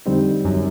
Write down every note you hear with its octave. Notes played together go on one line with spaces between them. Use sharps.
F2 D3 G3 C4 D#4
F#2